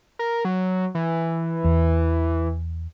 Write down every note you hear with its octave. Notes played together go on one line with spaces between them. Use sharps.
A#4
F#3
E3
E2